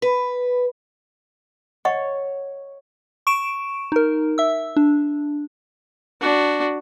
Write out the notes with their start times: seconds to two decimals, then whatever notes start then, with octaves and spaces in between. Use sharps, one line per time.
0.02 B4
1.85 C#5 D#5 F#5 C#6
3.27 C#6 D7 E7
3.92 D#4 A#4
4.38 E5 E6
4.77 D4
6.21 D4 F#4